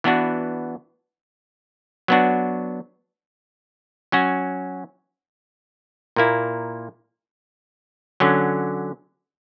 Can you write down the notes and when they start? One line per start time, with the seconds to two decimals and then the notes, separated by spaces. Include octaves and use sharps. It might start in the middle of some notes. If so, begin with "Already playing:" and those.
0.04 E3 B3 D4 F#4
2.08 F#3 B3 D4 F#4
4.12 F#3 C#4 F#4
6.16 A#2 A#3 E4
8.20 D3 F#3 C#4